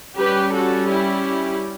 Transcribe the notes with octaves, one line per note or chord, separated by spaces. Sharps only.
G3 C#4 G4 B4
F#4 A4
E4 G4